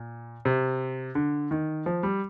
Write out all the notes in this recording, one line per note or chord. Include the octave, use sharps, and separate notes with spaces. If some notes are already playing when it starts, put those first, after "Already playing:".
Already playing: A#2
C3
D3
D#3
F3
G3